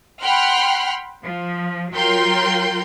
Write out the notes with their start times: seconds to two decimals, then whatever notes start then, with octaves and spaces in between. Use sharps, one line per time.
0.22 F#5 G5 B5 C6 F6 F#6
1.24 F3
1.93 F#3 F4 A#4 G5 C6 G6